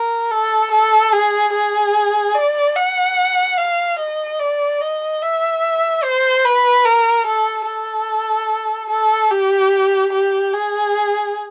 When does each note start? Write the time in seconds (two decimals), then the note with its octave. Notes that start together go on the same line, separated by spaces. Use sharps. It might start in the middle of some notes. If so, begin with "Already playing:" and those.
Already playing: A#4
0.31 A4
0.71 A4
1.13 G#4
1.54 G#4
2.35 D5
2.76 F#5
3.58 F5
3.99 D#5
4.40 D5
4.81 D#5
5.22 E5
6.03 C5
6.44 B4
6.85 A#4
7.26 A4
7.67 A4
8.90 A4
9.31 G4
10.12 G4
10.53 G#4